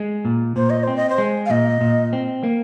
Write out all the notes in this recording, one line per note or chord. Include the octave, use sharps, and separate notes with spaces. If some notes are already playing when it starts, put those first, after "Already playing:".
Already playing: G#3
A#2
A#2 C5
D#5
C4 C5
D#5
C5
G#3
F5
A#2 D#5
A#2
C4
A#3